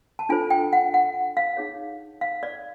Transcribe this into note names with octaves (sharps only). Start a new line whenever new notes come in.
A5
D4 F4 A4 C5 G#5
G5
F#5
F#5
F5
D#4 G#4 C#5
F5
D5